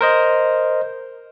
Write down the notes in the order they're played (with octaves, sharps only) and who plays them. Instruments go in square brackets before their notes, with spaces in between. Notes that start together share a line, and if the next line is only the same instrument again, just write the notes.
[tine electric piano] A#4 C5 D#5